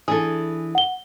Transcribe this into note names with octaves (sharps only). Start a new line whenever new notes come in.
E3 D4 G#4 A4
F#5 G7